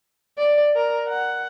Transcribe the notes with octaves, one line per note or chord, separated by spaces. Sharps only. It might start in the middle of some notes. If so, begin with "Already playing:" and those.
D5
A#4
F#5